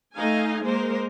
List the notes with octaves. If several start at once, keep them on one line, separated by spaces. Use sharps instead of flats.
A3 D#4 D#5 F5 G#5
G#3 A#3 A#4 C5